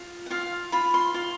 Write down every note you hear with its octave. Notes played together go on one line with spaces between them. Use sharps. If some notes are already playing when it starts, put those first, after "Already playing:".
Already playing: F4
F#5
F4 F5
F4 B5
C6
F4 C6